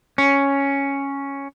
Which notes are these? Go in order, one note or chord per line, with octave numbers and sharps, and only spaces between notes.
C#4